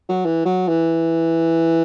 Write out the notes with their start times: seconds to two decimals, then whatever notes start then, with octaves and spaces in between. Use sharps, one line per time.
0.09 F#3
0.25 E3
0.46 F#3
0.68 E3